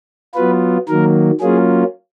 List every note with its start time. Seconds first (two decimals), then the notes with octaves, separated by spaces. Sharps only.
0.35 F#3 B3 F4 B4
0.88 D#3 F#3 A#3 A#4
1.41 F#3 A#3 C#4 F4 G#4